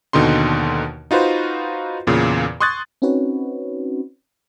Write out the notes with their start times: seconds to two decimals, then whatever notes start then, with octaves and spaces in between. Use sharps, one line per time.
0.13 D#2 B2 D3 D#4 C6
1.11 D#4 F4 F#4 B4 C5
2.07 E2 A#2 C#3
2.60 C6 C#6 D#6 F#6 G#6 A6
3.02 C4 C#4 D#4 F#4 B4 C#5